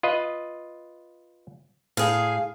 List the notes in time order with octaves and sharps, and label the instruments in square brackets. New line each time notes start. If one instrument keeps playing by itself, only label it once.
[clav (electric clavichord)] F4 B4 D#5
[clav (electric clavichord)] A2 [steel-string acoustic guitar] G#4 F5